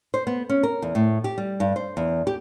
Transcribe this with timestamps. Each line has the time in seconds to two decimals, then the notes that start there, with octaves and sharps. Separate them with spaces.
0.14 C5
0.27 B3
0.49 C#4
0.63 A#4
0.82 E2
0.95 A2
1.24 G4
1.38 G3
1.60 G2
1.76 C5
1.97 E2
2.27 G4